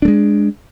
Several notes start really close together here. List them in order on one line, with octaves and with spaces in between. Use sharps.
D4 A3 G#3